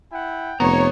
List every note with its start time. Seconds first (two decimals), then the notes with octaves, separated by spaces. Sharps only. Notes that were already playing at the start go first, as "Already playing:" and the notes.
0.12 E4 F#5 G5
0.60 F1 B3 C#5 A#5